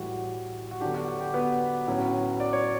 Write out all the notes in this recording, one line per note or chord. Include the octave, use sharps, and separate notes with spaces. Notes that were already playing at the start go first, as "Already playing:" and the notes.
Already playing: A2 E3 G3 F#4
F#4
D3 F#3 B3 D4 G4
F#4
F#4
G4
B3 B4
A2 F#3 C#4
D5
C#5